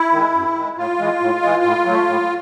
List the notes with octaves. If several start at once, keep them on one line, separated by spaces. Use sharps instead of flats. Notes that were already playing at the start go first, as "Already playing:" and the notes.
Already playing: E4
D#3 G#3
F#2
D#3 G#3
A2 F4
E3 G#3
A2
E3 G#3
A2
F#3 A3
A2